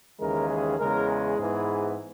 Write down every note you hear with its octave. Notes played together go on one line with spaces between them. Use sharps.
D#2 C#3 E3 G#3 A#4
G#4
E2 C#3 G#3 A#4
G#4
G#2 E3 B3